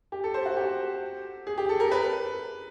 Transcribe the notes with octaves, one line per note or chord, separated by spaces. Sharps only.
G4
A4
C5
F#4
G4
G#4
G4
A4
A#4
B4